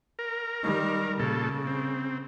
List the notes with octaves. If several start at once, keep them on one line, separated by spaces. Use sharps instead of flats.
A#4
D#3 G3
A#2 C#3 A4
C4